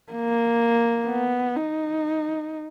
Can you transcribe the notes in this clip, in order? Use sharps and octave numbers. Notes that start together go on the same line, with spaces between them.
A#3
B3
D#4